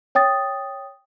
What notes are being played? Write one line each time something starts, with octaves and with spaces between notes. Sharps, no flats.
C#5 G5 D#6 A6